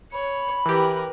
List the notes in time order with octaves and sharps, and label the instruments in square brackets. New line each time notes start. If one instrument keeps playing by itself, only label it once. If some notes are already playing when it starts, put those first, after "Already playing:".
[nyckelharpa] C#5 [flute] B5
[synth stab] E3 G4 [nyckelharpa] A#4 B4